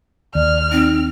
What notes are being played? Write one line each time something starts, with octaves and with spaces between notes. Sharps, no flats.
D#2 D5 F6
C4 D#4